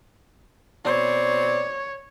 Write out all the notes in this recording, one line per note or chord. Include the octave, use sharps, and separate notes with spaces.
B2 C4 C#5 D5